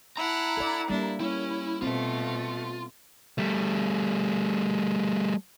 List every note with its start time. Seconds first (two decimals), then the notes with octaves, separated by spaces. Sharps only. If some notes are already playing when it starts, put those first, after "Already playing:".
0.17 E4 F#5 A5 A#5
0.57 A4 D5
0.90 G3 A#3 D4 E4
1.21 C#4 E4
1.82 B2 A3 C4 F4
3.38 G3 A3